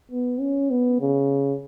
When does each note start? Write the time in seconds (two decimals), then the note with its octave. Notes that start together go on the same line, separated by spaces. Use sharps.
0.11 B3
0.40 C#4
0.70 B3
1.01 C#3